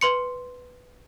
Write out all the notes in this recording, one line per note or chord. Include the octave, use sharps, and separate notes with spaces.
B4 C6 C#7